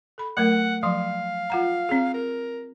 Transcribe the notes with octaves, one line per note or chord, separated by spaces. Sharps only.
A4 B5
F#3 A3 A#4 F#5
F3 F#3 F5 C6
F4 F#5 A#5
C4 G#4
A#4